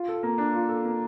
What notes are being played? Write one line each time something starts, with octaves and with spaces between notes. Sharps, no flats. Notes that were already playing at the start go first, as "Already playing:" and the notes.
Already playing: F4
A4
A#3
D4
F4
A4
A#3